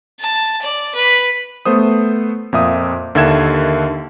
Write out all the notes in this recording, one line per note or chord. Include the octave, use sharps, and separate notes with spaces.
A5
D5
B4
A3 B3 C5 D#6
F2 A#2 E5 D#6
D#2 D3 D#3 E5 G#6 E7